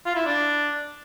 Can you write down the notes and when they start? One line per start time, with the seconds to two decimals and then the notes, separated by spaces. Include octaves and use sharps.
0.06 F4
0.16 E4
0.26 D4